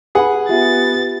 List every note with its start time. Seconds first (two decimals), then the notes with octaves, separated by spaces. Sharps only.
0.15 G#4 B4 F#5 B5
0.49 B3 F4 G4 E5 A6